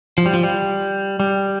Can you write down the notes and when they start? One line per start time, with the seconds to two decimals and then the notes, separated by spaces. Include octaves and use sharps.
0.18 F3
0.26 G3
0.34 F3
0.43 G3
1.20 G3